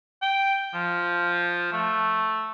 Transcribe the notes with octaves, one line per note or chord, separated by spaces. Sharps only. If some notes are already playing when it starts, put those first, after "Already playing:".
G5
F3
A3